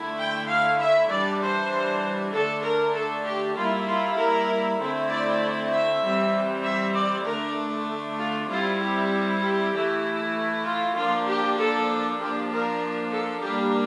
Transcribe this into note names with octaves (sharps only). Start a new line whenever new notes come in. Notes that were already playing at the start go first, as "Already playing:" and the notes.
Already playing: D3 A3 E4
G5
F5
E5
E3 G3 D4 D5
C5
D3 A3 D4 A4
A#4
A4
G4
G3 A#3 E4 F4
F4
A#4
D3 A3 C4 E4
D5
E5
E3 G3 C4
E5
D5
D3 A3 D4 A#4
F4
G3 C4 E4 F4
G4
G4
E3 A3 E4
F4
F3 A#3 D4 F4
G4
A4
F3 A#3 D4 G4
A#4
A4
G3 A#3 D4 G4